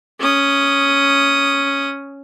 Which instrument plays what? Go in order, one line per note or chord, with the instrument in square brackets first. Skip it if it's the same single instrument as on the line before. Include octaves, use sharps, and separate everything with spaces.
[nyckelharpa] C#4 D#6